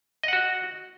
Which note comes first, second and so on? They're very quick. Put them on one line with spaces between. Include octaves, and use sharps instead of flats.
D#5 F#5 F#4